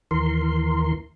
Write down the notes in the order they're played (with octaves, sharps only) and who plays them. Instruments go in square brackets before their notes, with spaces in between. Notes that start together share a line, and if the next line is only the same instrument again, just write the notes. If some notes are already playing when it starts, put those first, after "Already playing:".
[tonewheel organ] D#2 E3 A#4 C6